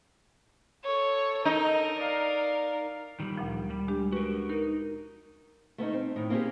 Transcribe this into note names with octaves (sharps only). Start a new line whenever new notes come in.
A4 C#5
D#4 A#4
D5 F5
D#3 G3
D2 A#2 F3
G3
G#3 D4 G4
F#4 A#4 B4
D#4 A#4
A3 B3 C#4 D#4
C4
A2 D#3
A#3 C4 C#4 F4 G4 G#4